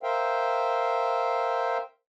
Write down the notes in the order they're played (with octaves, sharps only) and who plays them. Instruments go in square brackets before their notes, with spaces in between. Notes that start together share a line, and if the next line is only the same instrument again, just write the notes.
[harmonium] A#4 C5 E5 F5 G5